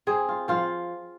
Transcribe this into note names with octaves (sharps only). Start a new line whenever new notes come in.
C4 G#4
F4
F3 F4